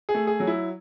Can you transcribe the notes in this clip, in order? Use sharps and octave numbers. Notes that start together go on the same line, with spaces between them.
G#4
A3
G#4
F#3
E4